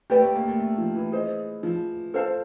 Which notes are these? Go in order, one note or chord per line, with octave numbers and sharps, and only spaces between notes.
A3 G4 B4 D5 G5
A3
A#3
A3
A3
F3
E3
G#4 C5 D#5
F3
A4 C5 F5 A5